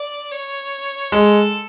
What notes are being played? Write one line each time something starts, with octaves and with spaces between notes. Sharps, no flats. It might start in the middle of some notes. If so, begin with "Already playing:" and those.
Already playing: D5
C#5
G#3 A4